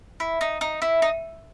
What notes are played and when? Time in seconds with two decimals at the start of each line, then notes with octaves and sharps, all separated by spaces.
0.20 E4
0.41 D#4
0.61 D#4
0.82 E4
1.02 D#4